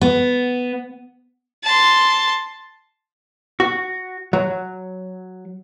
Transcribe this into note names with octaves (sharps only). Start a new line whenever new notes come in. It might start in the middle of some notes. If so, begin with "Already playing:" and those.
B3
A5 C6
F#4
F#3